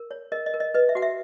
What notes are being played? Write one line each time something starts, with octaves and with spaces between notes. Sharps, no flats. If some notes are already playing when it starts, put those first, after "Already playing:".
Already playing: A#4
C#5
A#4 D#5
D#5
A#4
D#5
B4 D#5
E5
F#4 F#5
E5